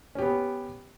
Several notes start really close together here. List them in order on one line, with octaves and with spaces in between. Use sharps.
C#4 G4 B3